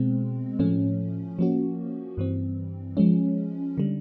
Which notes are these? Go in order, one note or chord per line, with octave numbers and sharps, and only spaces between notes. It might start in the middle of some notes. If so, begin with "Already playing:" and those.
Already playing: B2 G#3 C4
A2 F3 A3 C#4
F3 A#3 C#4 F#4
G2 E3 G3 C4
F3 G#3 C#4
D3 G3